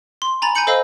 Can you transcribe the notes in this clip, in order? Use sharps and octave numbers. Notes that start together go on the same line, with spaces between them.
C6
G#5 A#5 B5 A6
G#5 A#5 B5 G6 C#7 F#7
A4 C5 D#5 F5 B5 E6